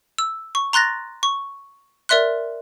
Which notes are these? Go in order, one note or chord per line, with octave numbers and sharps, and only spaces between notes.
E6
C#6
A#5 C6 F#6 A6 A#6
C#6
A#4 D5 E5 C6 F#6